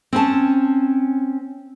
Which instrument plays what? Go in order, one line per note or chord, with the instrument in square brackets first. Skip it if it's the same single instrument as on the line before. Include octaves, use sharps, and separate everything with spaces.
[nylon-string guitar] C4 C#4 A5